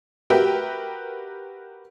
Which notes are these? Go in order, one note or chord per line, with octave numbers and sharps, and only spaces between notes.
F#4 G4 A#4 B4 E5 G5